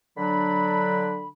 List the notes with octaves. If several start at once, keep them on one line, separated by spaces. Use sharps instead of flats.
D3 F#3 D4 B5